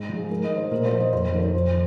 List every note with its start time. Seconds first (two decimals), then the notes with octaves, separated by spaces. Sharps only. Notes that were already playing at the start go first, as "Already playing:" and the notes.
Already playing: G#2
0.09 F3
0.17 G#4
0.30 G#2 A#4
0.44 D#5
0.50 D#3
0.57 C5
0.71 A#2 A#4
0.86 C5
0.93 F3
1.00 D#5
1.13 F2 C5
1.27 A#4
1.33 D#3
1.40 C5
1.54 F2